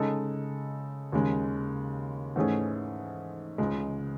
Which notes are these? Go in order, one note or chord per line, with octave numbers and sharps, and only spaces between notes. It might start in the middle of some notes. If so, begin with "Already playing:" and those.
Already playing: C#3 G#3 D#4 A4
D#2 C#3 G#3
G#2 E3 A3 C#4 G#4
C#2 C#3 G#3